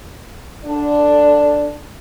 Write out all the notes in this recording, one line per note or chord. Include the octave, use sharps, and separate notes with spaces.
D3 D4